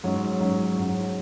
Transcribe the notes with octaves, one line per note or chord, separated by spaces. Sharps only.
G#2 F#3 C#4
G#2 F#3 C#4
G#2 F#3 C#4